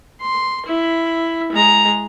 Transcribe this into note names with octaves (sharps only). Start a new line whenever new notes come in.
C6
E4
G#3 A#5